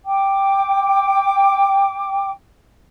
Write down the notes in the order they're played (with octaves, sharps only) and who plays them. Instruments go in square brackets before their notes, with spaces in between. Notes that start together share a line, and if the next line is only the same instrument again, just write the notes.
[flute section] G5 D6